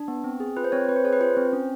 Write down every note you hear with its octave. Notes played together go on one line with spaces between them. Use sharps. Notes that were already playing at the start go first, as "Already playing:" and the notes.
Already playing: D4
B3
C4
G#4
F4 B4
C5
C4 C#5
C4 B4
C5
G#4 C#5
B4
F4 C5
C4
C#4